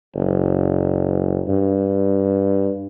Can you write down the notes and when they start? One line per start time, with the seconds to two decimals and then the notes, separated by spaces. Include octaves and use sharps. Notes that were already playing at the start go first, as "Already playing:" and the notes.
0.15 F#1
1.48 G2